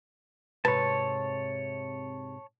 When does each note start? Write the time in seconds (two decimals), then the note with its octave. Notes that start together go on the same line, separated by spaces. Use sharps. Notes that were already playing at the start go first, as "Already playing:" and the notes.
0.65 G#2 C3 B4 C#5 A5